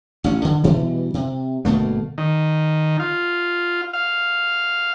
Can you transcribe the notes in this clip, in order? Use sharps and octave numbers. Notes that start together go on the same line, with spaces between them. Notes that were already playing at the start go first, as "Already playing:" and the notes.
A1 C#4
D3
B2 E3 G3
C3
G1 B2 A3 A#3
D#3
F4
F5